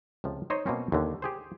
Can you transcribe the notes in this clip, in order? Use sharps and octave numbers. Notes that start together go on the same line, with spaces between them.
C#2 C3 F3
D#4 C5 C#5 D#5
B2 A#3 C4 C#4
D#2 D3
G4 G#4 C5